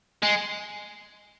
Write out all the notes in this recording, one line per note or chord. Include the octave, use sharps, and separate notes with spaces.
G#3